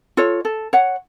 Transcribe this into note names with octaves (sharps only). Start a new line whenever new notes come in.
F4 A4 C#5
A4
C#5 F#5